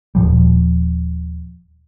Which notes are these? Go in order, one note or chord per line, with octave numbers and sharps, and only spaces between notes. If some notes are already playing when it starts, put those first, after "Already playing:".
D#1 A#2 F3 G3